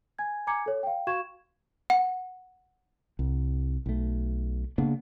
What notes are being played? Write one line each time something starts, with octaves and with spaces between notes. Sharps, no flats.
G#5 G#6
G#5 A#5 D6 G#6 C#7
A4 C#5
F5 G5
F#4 F5 C#6 G#6 E7
F#5
C2
B1 A3
C#3 A#3 B3 D4